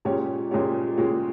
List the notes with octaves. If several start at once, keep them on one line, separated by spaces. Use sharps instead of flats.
A#2 G#3 C#4 G4 C#5
A#2 G#3 C#4 G4 C#5
A#2 G#3 C#4 G4 C#5